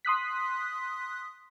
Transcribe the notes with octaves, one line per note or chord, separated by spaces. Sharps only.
C6 D#6 F#6 B6